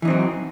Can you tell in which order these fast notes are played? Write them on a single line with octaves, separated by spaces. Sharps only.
E3 D#4 C4 F#3